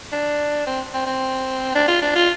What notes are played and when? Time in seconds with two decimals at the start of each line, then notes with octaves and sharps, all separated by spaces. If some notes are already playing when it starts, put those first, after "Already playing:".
0.12 D4
0.66 C4
0.94 C4
1.06 C4
1.75 D4
1.88 F4
2.02 D4
2.16 F4